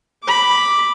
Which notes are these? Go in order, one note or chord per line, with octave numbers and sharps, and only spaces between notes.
B5 D6